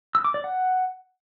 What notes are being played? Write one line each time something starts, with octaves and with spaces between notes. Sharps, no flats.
E6
D6
D5
F#5